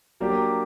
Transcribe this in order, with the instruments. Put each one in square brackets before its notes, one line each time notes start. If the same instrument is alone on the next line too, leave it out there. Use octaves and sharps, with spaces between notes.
[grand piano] F#3 A#3 D4 G4